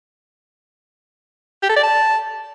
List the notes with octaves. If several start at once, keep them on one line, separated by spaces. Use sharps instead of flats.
G4
A4
D5
A5